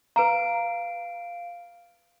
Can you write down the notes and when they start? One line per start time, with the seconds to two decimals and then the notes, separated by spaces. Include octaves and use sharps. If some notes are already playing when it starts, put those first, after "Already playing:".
0.16 B4 F5 A#5 D7